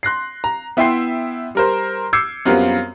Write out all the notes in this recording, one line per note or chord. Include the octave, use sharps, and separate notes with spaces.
C6 F#6 A#6 C7
A#5
B3 E4 E5 G5 C6 C7
G3 A#4 C5
D6 E6 G6 G#6 C7 C#7
F#2 G3 B3 C4 F4 A#4